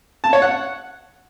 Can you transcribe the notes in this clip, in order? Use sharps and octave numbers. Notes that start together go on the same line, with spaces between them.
A5
C#5
F#5